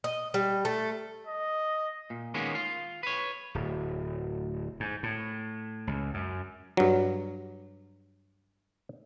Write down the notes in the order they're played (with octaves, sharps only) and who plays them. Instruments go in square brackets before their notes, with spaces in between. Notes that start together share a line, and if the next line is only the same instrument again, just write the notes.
[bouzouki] D#5
G3
A3
[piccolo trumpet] D#5
[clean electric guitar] A#2
D#3 G#3 A#3 B3 C#4
F4
B4 C#5
[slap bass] D1
G#2
A2
C#2
F#2
[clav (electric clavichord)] G2 F#3